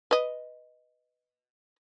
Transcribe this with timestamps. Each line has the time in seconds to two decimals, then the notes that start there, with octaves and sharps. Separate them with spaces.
0.11 B4 D#5